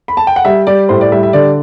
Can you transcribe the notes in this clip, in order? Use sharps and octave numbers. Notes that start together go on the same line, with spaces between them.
B5
A5
G5
F#5
G3 E5
G3 D5
A2 C5
D5
G3 E5
E5
D3 D5